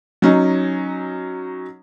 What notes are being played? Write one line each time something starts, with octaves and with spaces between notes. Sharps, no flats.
F#3 C#4 D#4